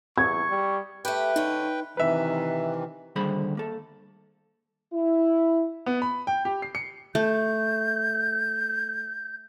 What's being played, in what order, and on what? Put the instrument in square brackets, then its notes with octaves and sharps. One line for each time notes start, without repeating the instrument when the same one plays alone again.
[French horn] E2 [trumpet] C#6 [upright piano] G#6
[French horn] G3
[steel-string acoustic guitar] A3 G4 [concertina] B4 G5
[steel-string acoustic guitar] D3 C#4 [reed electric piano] D#4
[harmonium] C3 D#3 E3 [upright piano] B4 E5
[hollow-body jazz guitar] D#2 D3 G3 G#4 C5 B5
A#3 A4
[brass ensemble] E4
[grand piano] B3
B5
G5
G4
C7
C#7
[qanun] A3 [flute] G6